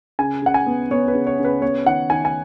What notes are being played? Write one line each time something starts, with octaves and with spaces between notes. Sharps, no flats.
C#3 G#5
C#3 F#5
G#5
B3
B3 C#5
B4
C#3
C#5
C#3
B4
B3 C#5
D#3 F#5
D#3 G#5
G#5